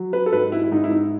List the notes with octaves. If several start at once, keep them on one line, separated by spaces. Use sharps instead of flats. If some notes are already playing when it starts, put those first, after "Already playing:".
Already playing: F#3
B4
A4
G#2 B4
E4
E4
G#2 D#4
E4
D#4